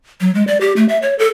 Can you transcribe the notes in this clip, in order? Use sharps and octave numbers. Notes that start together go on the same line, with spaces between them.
F#3
G#3
D5
G4
A3
E5
C#5
A4